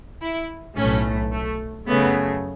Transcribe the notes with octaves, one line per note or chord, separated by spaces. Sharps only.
E4
B1 A2 A3 C#4
A3
F#2 C#3 A3 B3